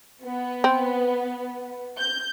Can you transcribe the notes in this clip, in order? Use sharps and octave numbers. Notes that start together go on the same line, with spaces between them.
B3
C4
G6